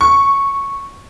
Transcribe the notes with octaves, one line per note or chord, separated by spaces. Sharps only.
C#6